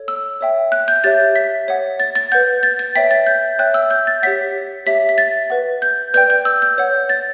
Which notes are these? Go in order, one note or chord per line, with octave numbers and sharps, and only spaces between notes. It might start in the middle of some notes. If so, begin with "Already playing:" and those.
Already playing: A4 C#5
E6
C#5 E5 G5
F#6
G6
G4 C#5 E5 A6
B6
C#5 F#5
A6
A6
B4 F#5 G6
A6
A6
C#5 E5 G5 B6
A6
G6
C#5 E5 G5 F#6
E6
G6
A6
G4 C#5 F#5 B6
G4 C#5 E5 B6
B6
A6
B4 F#5
G6
B4 D5 G5 G6
G6
E6
G6
C#5 F#5
A6